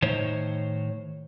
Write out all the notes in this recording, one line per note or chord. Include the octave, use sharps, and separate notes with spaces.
A2 D#3 C5 C#5